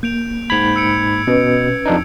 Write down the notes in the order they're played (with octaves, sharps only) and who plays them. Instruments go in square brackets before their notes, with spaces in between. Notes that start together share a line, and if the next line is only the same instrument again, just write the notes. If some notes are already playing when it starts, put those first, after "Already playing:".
[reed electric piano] A#3 [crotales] G6 D7 F7
[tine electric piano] G#2 B5 [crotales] G#6 F7
[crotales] E6 C#7 D7
[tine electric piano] B2 [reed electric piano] C#4 B4
[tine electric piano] F2 D4 D#4